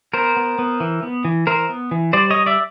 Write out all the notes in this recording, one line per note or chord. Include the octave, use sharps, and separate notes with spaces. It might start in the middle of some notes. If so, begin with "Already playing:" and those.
B3 A#4 C5
B3
B3
E3
B3
E3
E3 A#4 C5
B3
E3
G3 C5 D5
C#5 D#5
G3
D5 E5